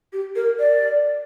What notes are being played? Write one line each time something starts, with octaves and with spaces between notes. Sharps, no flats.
G4
A#4
D5